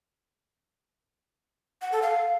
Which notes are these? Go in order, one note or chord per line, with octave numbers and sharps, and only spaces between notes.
F#5
A4
F5